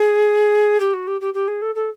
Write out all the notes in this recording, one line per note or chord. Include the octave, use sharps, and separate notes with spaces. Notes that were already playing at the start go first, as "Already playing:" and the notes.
Already playing: G#4
G4
F#4
G4
G4
G4
G#4
A4
A4